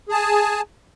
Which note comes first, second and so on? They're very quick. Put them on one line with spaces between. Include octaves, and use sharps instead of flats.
G#4 A5 G#5